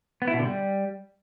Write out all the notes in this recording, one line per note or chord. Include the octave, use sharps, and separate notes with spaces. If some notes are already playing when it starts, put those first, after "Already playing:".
B3
E4
B2
D3
G3